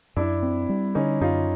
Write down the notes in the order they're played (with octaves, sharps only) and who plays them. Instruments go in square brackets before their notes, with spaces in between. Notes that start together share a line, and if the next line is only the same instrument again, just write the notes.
[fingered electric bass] F#2 [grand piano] D4 E4
[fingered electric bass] C4
G3
[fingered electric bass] D3 [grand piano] C#4 D#4
[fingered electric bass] F#2 [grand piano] D#4 F4